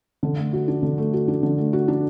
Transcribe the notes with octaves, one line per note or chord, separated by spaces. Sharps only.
D3
A3
F#4
D4
D3
A3
F#4
D4
D3
A3
F#4
D4